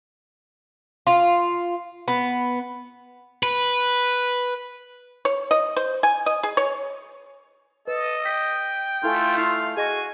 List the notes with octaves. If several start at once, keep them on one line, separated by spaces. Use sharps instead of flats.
F4
B3
B4
C#5
D#5
C5
G#5
D#5
G#4
C#5
A4 B4 D#5
G5 B6
A3 E4 F4 A4 G#5
E4 F5
F#4 G#4 D#5 G#5 A#6